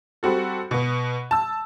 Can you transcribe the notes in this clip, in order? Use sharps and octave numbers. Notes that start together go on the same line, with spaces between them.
G3 C4 F#4 A4
B2 B3
A5 E6